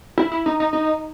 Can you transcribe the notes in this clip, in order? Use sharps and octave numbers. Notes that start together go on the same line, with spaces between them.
E4
E4
D#4
D#4
D#4